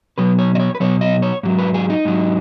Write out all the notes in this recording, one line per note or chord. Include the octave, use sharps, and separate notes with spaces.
B2 F#3 B4
C#5
D#5
C#5
B4
B2 F#3 C#5
D#5
C#5
G#2 F#3
B4
G#4
D#4
G#2 F#3